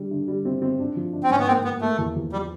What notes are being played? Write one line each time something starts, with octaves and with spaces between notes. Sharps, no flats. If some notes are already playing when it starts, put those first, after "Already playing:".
Already playing: D3 G3
D3
G3
C4
C4
D4
F3
D4
C4
G#2 C#4
B3
A#3 C4
A#3 B3
A3 A#3
E2
E2
F3 G3